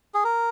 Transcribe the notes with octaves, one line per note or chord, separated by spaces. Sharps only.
G#4
A#4